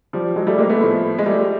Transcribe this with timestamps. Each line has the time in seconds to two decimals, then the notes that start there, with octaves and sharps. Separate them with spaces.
0.13 F3 G3
0.36 F#3 G#3
0.47 G3 A3
0.58 G#3 A#3
0.69 A3 B3
0.81 A2 F3
1.19 G#3
1.26 G3 A3